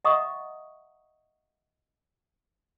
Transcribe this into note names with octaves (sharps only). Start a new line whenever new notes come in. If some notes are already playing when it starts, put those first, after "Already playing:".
D#5 E5 F#5 A#5 C#6 D#6